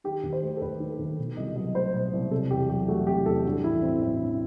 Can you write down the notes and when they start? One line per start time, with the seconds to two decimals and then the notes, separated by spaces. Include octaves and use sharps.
0.04 D#3 G4
0.23 D#2
0.33 C5
0.42 A3
0.57 A4
0.61 D#2 B4
0.80 D#3
0.90 A4
0.99 D#2
1.18 B2
1.37 C2 D#5
1.56 F#3 D#5
1.75 A3 C5
1.93 B2
2.13 C2
2.31 C3 A4
2.51 E2 G4
2.69 F#3 G4
2.88 A3 F#4
3.07 C3 G4
3.26 E2 A4
3.45 G2 F#4
3.64 A1 E4
3.82 E3 C4
4.02 A1
4.20 G2